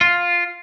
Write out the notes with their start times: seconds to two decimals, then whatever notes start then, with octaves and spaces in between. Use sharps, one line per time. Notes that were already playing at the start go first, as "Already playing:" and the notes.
0.01 F4